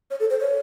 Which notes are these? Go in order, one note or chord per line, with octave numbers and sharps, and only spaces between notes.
C#5
A4
C5
C#5